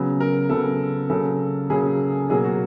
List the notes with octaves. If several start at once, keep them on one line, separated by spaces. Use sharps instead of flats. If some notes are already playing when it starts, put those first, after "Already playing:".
Already playing: C#3 F#3 B3
A#4
C#3 F#3 B3 A4
C#3 F#3 A#3 A4
C#3 F#3 A#3 G#4
B2 F#3 A#3 G#4
F#4